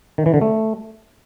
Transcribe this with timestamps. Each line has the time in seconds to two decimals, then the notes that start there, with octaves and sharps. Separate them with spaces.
0.18 D#3
0.26 E3
0.34 D3
0.41 A3